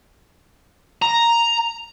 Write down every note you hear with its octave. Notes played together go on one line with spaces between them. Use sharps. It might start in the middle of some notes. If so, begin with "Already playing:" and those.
A#5